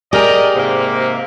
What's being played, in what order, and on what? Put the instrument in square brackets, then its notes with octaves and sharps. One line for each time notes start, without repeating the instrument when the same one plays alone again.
[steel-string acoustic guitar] G4 G#4 [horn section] A#4 D5 D#5
[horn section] G#2 C3 A#3